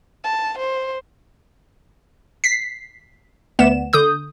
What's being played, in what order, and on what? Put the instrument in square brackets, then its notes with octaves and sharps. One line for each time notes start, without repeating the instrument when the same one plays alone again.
[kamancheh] A5
C5
[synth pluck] B6 C7
D2 B3 E7
D3 D#6 G6